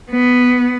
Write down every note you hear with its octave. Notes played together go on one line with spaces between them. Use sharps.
B3